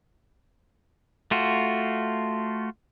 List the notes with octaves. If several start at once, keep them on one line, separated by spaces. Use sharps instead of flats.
A3 F4 F#4